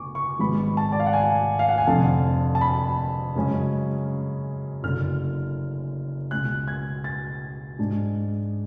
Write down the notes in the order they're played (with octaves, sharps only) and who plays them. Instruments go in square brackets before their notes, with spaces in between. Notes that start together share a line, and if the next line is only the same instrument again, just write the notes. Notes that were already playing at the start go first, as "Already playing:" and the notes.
Already playing: [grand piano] F#1 D3 B3 C#6 D6
C#6
G#1 G#2 G#3 B3 B5
A5
D5
F5
F#5
G#5
F5
F#5
G#5
F1 F2 D3 F3 A5
A5
B5
F#2 C#3 G#3 C#4
F#1 F#2 D3 F6
C#2 B2 G#3 C#4 F#6
G#6
A6
G#2 G#3 D4